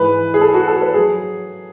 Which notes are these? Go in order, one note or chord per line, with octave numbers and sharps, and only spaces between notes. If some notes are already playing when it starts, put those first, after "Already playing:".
Already playing: G#2 E3 G#3 B4
G#4
A4
F#4
A4
B4
F#3 G#4